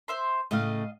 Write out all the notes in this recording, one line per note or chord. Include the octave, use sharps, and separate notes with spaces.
C5 E5 C6
A2 C#3 A3 D#5 F5